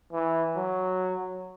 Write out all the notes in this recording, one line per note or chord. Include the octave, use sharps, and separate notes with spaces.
E3
F#3